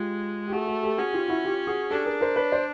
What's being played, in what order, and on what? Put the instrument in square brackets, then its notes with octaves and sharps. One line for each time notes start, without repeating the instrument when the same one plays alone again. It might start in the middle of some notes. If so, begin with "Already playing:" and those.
Already playing: [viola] G#3 [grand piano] F4 G4
[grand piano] G4
[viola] A3 [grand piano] F#4 G#4
[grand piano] F#4 G#4
G4 A4
[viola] C#4 [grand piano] F#4 G#4
[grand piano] F4 G4
E4 F#4
F4 G4
F#4 G#4
[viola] D4 [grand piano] G4 A4
[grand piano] G#4 A#4
A#4 C5
B4 C#5
C5 D5